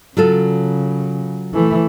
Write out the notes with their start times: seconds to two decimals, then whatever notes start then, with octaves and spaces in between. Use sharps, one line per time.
0.17 C#3 F#3 F4 A4
1.54 E3 A3